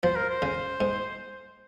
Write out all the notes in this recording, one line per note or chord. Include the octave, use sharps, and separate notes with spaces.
F3 C5
A#4
C5
C#3
G#2